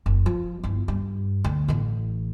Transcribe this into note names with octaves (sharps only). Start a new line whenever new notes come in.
F#1
F3
G1 E4
G2
D2
A1 E3